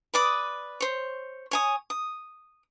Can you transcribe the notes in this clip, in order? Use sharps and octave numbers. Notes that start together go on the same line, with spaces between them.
B4 D5 D6 D#6
C5 C#5
C#5 G#5 D#6
D#6